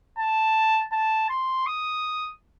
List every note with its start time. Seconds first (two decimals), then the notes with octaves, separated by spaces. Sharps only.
0.19 A5
0.92 A5
1.30 C6
1.66 D#6